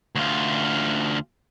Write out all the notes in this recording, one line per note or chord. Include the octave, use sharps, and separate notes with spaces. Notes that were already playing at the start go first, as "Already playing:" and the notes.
D2 F4